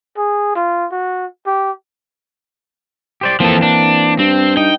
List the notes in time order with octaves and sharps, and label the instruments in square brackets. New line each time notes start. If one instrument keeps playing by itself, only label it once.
[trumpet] G#4
F4
F#4
G4
[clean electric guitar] G4 C5 D5
[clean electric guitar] E3 A#3 C4 [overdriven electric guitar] F3 A4
[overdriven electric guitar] D4
[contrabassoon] G2 [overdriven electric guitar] C4
[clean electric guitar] D#4 [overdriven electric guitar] G5